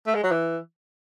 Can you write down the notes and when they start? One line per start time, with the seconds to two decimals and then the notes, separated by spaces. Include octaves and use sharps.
0.07 A3
0.15 G#3
0.23 F#3
0.31 E3